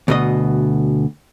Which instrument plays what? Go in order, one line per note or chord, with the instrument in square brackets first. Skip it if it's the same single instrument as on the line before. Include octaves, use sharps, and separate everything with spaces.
[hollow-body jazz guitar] D2 B2 D#5